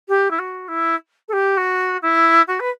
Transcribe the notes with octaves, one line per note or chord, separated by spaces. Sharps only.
G4
E4
F#4
E4
A4
G4
F#4
E4
F#4
B4